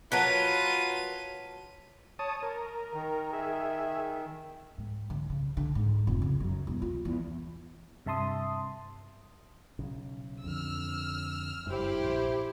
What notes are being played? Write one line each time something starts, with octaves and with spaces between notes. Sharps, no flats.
F#3 F4 A#4 B4 C#5 A5 B6 D#7
C#5 A5 D#6
A#4
D#3
G#4 E5
G#2
D3
C#3
D3
G#2
F1
C#3
F#2
E1
F4
E2
G2 C3 E5 A5 C6 D#6
B1 C#3
F2 D3 E6 F6
F#1 G2 E4 G4 C5
A#1